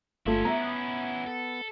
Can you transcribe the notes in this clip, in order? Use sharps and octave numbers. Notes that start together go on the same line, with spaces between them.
G1 A3 C#4 E4 F4
B3 E5 A#5
A4